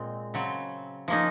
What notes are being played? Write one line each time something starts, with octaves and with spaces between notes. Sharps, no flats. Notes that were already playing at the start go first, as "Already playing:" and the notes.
Already playing: A#2 G#3 C4
C#3 F#3 C4
F3 A#3 C#4 D#4